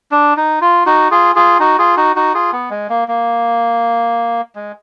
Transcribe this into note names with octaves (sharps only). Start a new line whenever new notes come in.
D4
D#4
F4
D#4 F#4
F4 G#4
F4 G#4
D#4 F#4
F4 G#4
D#4 F#4
D#4 F#4
F4 G#4
B3
G#3
A#3
A#3
G#3